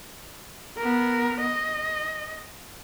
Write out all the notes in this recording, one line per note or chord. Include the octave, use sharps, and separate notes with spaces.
B3 A#4
D#5